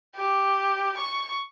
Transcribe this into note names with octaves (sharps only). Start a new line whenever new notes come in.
G4
C#6